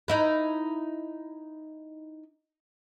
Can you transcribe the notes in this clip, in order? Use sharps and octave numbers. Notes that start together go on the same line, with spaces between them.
D#4 E4 B4